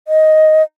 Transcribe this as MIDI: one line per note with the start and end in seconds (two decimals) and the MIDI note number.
0.08 0.62 75